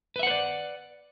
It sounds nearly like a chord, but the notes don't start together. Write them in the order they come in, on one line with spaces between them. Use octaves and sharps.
B4 E5 F#5 C5 D5